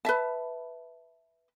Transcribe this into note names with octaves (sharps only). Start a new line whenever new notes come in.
B4 E5 A5